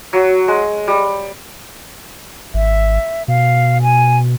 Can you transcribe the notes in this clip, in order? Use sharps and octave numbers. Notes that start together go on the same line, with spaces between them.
F#3
G#3
G3
G#1 E5
B2 F5
G#5